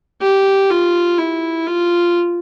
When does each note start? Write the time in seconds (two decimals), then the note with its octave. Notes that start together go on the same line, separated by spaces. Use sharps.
0.21 G4
0.70 F4
1.18 E4
1.67 F4